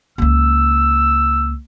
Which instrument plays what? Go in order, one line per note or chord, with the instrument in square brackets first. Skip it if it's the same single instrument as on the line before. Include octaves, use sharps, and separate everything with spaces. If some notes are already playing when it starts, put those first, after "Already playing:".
[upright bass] C#2 A#3 [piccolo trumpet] E6